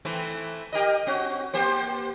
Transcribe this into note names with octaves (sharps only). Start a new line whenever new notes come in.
E3 A3 C4
G4 A#4 D#5
C4 F#4
A#3 G4 C5